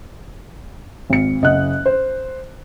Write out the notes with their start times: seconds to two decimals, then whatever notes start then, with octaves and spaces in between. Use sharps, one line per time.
1.10 G#1 C#7
1.42 F#1 D#5 F#5 F#6
1.86 C5